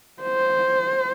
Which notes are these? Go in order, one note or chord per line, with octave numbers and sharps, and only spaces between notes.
C5